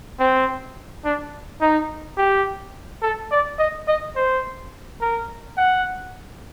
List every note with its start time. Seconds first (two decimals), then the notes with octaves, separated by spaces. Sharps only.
0.19 C4
1.05 D4
1.61 D#4
2.17 G4
3.02 A4
3.31 D5
3.59 D#5
3.88 D#5
4.16 C5
5.00 A#4
5.57 F#5